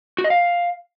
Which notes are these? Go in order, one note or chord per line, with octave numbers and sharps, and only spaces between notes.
F#4
D#5
F5